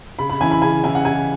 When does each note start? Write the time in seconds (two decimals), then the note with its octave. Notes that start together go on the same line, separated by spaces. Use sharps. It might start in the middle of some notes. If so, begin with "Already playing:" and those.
0.19 C#3 B5
0.30 B5
0.41 E3 C#4 E4 G#5
0.51 B5
0.62 C#3 G#5
0.84 E3 C#4 E4 G#5
0.95 F#5
1.05 C#3 G#5